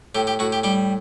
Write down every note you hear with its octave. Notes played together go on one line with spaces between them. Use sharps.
A2 G4
G4
A2 F#4
G4
G3 G4